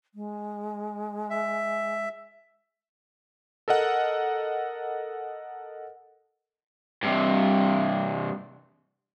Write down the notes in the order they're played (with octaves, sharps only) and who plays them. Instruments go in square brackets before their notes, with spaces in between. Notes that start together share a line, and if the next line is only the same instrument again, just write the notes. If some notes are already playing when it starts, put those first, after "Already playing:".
[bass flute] G#3
[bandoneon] E5
[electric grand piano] A4 A#4 D#5 F#5
[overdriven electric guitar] G2 C3